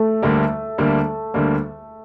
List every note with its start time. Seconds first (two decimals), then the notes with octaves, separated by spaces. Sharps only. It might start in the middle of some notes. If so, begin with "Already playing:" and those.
Already playing: A3
0.22 D2 D3 G3 A#3
0.78 D2 D3 G3 A#3
1.34 D2 D3 G3 A#3